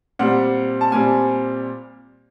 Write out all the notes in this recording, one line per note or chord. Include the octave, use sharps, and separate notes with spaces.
A#2 G3 C4 F#5
A5
A#2 G3 C4 G#5